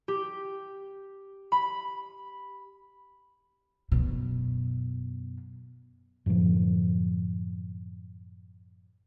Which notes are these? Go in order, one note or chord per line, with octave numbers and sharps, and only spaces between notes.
G4
B5
F#2 B2
F#2 A2 D3 F3